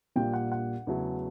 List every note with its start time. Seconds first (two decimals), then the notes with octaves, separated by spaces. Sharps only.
0.16 A#1 A#2 G3 A#3 G5
0.33 F#5
0.52 F#5
0.87 E2 C#3 F#3 A3